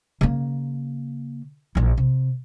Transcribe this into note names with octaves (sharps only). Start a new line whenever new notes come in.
C#3 A#3
A#1 E3
C3